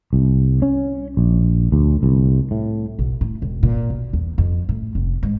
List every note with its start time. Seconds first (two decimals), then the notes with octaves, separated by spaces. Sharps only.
0.13 C2
0.62 C#4
1.17 A#1
1.72 D2
2.03 C2
2.51 A2
2.99 B1
3.21 A2
3.42 E1
3.63 A#2
3.90 B1
4.13 E2
4.38 F2
4.69 A2
4.95 F1
5.23 G#2